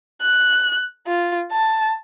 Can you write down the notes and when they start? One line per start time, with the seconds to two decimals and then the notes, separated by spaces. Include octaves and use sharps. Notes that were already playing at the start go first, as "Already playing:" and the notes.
0.22 F#6
1.07 F4
1.52 A5